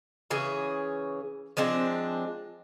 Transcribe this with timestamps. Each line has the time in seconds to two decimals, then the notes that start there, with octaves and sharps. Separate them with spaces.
0.31 C#3 E3 G#4 C#5
1.57 F3 G#3 C4 D4